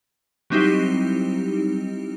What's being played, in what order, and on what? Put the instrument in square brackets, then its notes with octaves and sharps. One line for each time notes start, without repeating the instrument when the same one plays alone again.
[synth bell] F#3 G3 C4 D#4 E4 G4